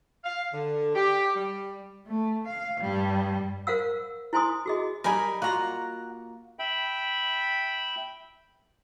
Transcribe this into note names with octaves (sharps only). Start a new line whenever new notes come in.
F5
D3
G4
G3
A3
F5
G2 G3
A#4 C5 F5 F#5 E6
E4 C5 G#5 C6 D#6
F#4 G#4 D#5
G3 D#4 A#4 D#5 G#5 B5
A#3 F4 F#4 F#5 A#5
E5 G5 B5